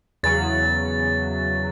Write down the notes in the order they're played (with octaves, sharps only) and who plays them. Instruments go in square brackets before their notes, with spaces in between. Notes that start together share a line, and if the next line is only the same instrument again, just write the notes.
[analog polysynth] E2 C#3 F#3 [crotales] A6